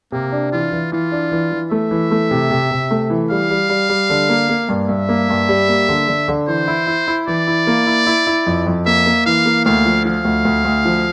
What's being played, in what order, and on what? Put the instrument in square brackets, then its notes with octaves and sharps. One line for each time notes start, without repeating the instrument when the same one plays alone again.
[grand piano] C3 [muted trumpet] A#3
[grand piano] D4
[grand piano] E3 [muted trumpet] F4
[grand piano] E3
[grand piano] E3 [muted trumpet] F4
[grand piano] D4
E3
E3
[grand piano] A3 [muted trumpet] E5
[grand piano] E3
A3
C3
C3
C3
A3
E3
[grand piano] G3 [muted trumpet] F5
[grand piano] G3
G3
G3
D3
A#3
A#3
G2
[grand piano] G2 [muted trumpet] E5
[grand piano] A#3
G2
G3
A#3
D3
D3
D3
[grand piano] E3 [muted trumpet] C5
[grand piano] E4
E4
E4
[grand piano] E3 [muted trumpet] D5
[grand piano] E4
A#3
E4
E4
E4
F2
F2
[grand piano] A#3 [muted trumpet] E5
[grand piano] A#3
[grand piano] E3 [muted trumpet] F5
[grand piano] A#3
[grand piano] D2 [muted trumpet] F5
[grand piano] F3
[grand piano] F3 [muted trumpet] F5
[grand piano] D2
D2
D2
F3